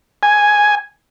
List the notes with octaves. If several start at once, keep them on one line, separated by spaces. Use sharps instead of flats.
G#5